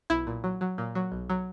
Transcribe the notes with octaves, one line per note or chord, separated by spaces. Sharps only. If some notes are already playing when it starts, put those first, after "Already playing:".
B1 E4
A#2
F#3
F#3
A#2
F#3
B1
F#3